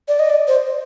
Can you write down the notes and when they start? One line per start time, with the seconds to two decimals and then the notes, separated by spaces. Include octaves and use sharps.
0.08 D5
0.19 D#5
0.30 D5
0.48 C5